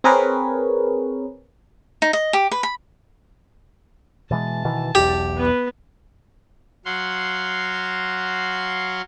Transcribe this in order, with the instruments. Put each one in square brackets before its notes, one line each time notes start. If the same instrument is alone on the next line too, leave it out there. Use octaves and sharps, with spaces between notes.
[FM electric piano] C4 G#4 A#4 B4 C#5
[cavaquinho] D#4
D#5
G4
B4
B5
[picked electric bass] B2 E3 G#3 [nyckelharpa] A5
[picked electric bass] B2 D#3 E3
[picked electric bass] E1 B1 E2 [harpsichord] G4
[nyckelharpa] B3 B4
[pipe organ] F#3 F#4 F5 C6